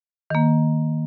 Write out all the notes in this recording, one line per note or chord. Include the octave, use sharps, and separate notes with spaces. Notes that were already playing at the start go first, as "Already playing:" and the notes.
D#3 A#3